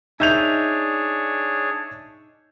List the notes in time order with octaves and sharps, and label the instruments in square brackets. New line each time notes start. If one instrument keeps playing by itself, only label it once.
[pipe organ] D4 G#4 C#5 [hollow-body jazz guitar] D#4 [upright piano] E5 G6 F7